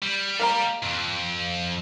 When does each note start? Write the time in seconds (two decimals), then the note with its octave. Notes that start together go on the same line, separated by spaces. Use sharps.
0.02 G3
0.39 A#3 F5 A#5
0.83 F2